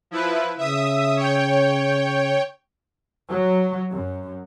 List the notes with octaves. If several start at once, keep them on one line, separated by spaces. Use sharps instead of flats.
F3 E4 B4
C#3 E5 D#6
C#5 G5
F#3
F#2